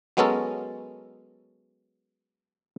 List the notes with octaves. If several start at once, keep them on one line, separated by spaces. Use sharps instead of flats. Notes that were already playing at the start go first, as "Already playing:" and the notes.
F#3 G#3 B3 C#4 A4 A#4